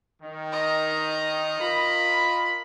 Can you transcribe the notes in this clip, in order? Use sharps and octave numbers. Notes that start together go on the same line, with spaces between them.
D#3
D#5 A#5
F4 A#4 B5